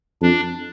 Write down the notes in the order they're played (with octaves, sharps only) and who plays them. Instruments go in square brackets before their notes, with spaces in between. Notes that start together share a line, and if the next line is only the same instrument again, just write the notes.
[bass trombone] F2 [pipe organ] D4